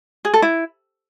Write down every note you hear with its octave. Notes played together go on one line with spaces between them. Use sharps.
G#4
A4
E4